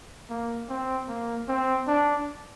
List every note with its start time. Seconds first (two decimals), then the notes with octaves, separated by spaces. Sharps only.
0.30 A#3
0.69 C4
1.08 A#3
1.48 C4
1.87 D4